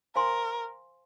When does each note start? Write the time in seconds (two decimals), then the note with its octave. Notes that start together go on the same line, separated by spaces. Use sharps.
0.15 A#4 C5 F5 G#5 C6